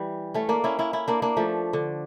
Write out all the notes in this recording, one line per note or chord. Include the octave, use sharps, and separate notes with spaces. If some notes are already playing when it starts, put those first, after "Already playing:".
Already playing: E3 G3
A3 C#4
A#3 D4
C#4 E4
C#4 E4
C#4 E4
A#3 D4
A#3 D4
F3 A3
D3